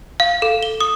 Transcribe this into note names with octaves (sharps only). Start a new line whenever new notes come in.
F5
A4
G7
D#6